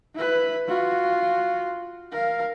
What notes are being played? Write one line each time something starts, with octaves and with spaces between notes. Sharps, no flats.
E4 B4
F4 F#4
A#4 F5